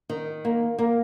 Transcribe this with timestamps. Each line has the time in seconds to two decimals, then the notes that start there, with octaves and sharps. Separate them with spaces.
0.09 D#3
0.45 A#3
0.79 A#3